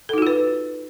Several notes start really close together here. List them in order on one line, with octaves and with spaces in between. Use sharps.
A4 D#4 F#4 F4 B4